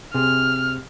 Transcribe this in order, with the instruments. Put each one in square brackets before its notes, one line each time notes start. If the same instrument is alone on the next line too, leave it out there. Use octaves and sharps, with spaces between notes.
[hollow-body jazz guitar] C3 G#4 [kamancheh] F6